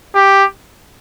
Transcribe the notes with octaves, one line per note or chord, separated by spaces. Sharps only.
G4